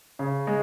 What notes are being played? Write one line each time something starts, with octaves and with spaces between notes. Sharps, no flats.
C#3
G#3